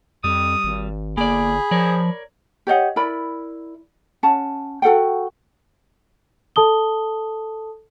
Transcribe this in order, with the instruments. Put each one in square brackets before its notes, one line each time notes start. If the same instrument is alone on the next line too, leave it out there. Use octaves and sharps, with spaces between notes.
[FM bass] F2 [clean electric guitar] G3 [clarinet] D#6
[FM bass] G#1
[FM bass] G1 [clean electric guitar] A#3 D5 [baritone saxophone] G#4 [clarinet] B5
[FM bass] F3 [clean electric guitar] A#4 C#5 D5
[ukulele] G4 C#5 D#5 F#5
E4 A#4 D5 B5
C#4 F#5 A5
F#4 A4 F#5 G5
[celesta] A4 A5 D#6 G7